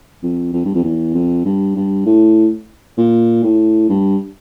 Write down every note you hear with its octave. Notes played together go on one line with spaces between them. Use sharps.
F2
F2
G2
F2
E2
F2
G2
G2
A2
A#2
A2
G2